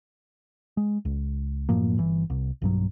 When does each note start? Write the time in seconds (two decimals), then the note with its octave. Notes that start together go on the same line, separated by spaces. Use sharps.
0.77 G#3
1.05 C#2
1.69 F#2 A2 F3 A#3
1.98 G1 E3
2.30 C2
2.62 B1 G2 F#3